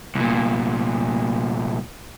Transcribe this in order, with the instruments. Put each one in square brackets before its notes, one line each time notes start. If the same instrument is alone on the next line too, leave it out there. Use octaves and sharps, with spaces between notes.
[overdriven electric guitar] C2 A#2